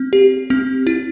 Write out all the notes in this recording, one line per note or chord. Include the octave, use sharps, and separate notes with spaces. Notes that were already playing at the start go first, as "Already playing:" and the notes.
Already playing: C4
G4
C4
E4